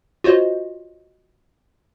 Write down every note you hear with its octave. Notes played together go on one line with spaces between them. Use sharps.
F4 F#4 C5 C#5 D#5